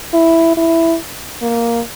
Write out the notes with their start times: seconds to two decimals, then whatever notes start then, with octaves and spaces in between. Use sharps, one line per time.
0.13 E4
0.57 E4
1.42 A#3